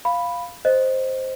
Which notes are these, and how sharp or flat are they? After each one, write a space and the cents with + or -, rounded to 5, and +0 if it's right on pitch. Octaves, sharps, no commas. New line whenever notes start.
F5 +0 B5 +0
C5 +0 D#5 +0